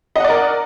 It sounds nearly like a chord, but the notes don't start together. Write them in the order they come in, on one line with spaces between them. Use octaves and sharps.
D#5 F#5 D5 A#4